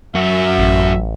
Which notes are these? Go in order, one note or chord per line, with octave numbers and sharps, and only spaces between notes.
F#2 F#4 E5
A1